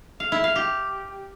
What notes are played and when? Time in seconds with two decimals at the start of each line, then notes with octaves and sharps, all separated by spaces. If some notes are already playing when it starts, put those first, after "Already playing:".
0.20 F5
0.32 E4
0.44 F5
0.56 G4